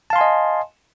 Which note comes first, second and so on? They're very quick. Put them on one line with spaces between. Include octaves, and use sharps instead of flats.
A5 F5 C6 G#5 D#5